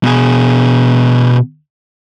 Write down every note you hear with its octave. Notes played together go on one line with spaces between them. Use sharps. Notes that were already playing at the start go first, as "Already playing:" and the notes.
B2 G#4